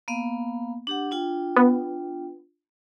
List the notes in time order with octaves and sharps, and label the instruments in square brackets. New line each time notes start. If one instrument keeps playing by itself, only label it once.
[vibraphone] A#3 B3 F5
D4 G4 F#5
D4 F4 G5
[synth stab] B3